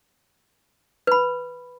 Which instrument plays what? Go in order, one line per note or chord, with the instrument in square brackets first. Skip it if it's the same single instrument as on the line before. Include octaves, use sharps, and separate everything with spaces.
[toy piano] B4 B5